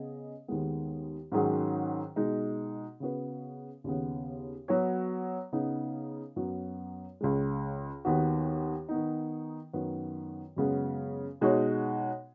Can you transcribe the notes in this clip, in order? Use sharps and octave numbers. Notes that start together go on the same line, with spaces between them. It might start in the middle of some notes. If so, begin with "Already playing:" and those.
Already playing: C#3 B3 G#4 D#5
D#2 D#3 G#3 B3
G#2 D#3 F#3 C#4 G#4
B2 G#3 D#4
C#3 B3 F#4 B4
D#2 C#3 B3
F#3 B3 F#4 C#5
C#3 B3 D#4
F#2 F#3 B3 F#4
C#2 C#3 G#3
D#2 D#3 B3 F#4
D#3 B3 D#4
F#2 D#3 B3 F#4 B4
F#2 C#3 G#3 B3
B2 G#3 D#4 F#4 C#5